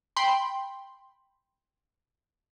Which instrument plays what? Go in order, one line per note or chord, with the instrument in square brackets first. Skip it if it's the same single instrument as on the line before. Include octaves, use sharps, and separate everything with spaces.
[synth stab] G5 B5 C6